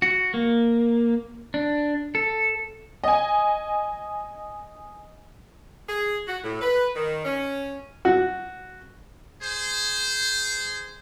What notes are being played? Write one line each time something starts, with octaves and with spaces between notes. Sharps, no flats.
F#4
A#3
D4
A4
D#5 G#5
G#4
F#4
A2
B4
D#3
C#4
F#4
G#4 C5